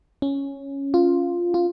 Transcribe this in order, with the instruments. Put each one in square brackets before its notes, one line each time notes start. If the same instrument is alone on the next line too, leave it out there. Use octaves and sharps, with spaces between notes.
[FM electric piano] C#4
F4
F4